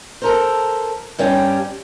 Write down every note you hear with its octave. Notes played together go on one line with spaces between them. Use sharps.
A4 A#4 C5
G2 G3 C#4 G5